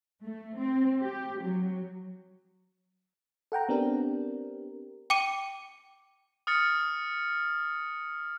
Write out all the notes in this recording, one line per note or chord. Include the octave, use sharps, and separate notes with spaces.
A3
C4
G4
F#3
A4 F#5 G5 A#5
B3 C4 D4 G4 A#4
G5 D6 C#7 D#7
D#6 F6 A6 C#7